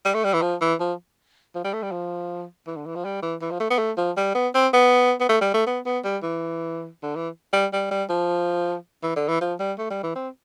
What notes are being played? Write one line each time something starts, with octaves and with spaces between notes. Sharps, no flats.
G3
A3
G3
E3
F3
E3
F3
F3
G3
A3
G3
F3
E3
D3
E3
F3
G3
E3
E3
F3
A3
B3
A3
F3
G3
B3
C4
B3
B3
A3
G3
A3
B3
B3
G3
E3
D3
E3
G3
G3
G3
F3
E3
D3
E3
F3
G3
A3
G3
E3
C4